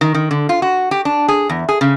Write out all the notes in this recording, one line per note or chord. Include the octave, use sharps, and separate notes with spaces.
D#3
D#3
D3
F4
F#4
G4
D4
G#4
E2
G#4
C#3